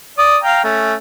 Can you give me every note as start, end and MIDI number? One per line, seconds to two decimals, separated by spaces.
0.18 0.37 74
0.18 0.37 87
0.43 0.61 77
0.43 0.61 79
0.43 0.61 82
0.64 0.94 57
0.64 0.94 61